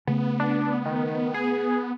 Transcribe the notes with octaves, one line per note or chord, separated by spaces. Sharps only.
C#3 A3 B3
D4
D#3
G#4